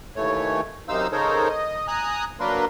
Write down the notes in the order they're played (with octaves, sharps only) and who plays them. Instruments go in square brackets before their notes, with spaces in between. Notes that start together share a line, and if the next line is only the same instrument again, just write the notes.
[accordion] D#2 E3 A3 C#5
F#2 C3 D#4 C5 F5 E6
C#3 D#4 A4 A#4 C5 C#5
D#5
G#5 A#5 D#6 F#6
F#3 A#3 D4 A#4 B4 C6